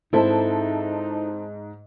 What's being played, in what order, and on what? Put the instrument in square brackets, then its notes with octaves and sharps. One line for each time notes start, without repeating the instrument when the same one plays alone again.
[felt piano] G#2 [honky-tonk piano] C4 A5 [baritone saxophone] D#4 [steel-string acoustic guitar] E4 A4 E5